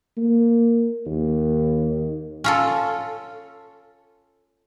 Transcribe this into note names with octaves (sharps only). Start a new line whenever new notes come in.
A#3
D#2
C#4 F4 A4